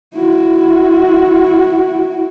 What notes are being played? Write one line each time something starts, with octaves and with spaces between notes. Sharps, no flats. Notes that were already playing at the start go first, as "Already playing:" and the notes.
E4 F#4